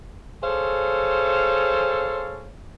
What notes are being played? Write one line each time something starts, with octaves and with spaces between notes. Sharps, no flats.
G#4 A4 C5 C#5 F5